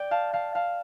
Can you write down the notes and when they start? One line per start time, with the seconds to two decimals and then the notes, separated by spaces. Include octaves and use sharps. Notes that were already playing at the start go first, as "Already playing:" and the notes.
Already playing: D5 G5
0.11 F5 A5
0.33 F5 A5
0.55 F5 A5